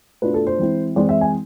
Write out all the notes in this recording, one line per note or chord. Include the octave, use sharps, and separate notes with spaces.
B2 A3 D4 F4 B4
A4
C5
E3 G#3 C4 E4
E3 G#3 C4 E4 D5
E5
G#5